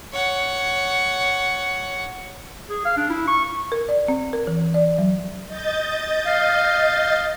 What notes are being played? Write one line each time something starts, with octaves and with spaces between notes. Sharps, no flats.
C#5 F#5
G#4
F5
D4
E4
C#6
A#4
D5
C4
A#4
E3
D5
F#3
D#5 G6 A6
F5